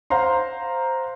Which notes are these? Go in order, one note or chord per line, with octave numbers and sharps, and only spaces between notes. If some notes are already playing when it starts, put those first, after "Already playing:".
C5 F5 F#5 A#5 C6